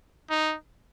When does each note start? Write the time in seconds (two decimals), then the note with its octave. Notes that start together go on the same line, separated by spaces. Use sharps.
0.30 D#4